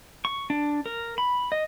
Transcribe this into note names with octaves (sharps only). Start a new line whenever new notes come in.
C#6
D4
A#4
B5
D#5